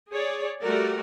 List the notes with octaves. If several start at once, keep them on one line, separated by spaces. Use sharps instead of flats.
G#4 C#5 D5
G3 A3 F#4 G4 A#4 D5